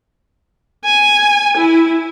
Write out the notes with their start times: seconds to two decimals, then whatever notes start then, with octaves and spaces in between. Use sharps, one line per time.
0.85 G#5
1.57 E4